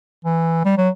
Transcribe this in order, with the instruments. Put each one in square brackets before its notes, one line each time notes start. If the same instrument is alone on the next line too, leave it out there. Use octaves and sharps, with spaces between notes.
[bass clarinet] E3
G3
F#3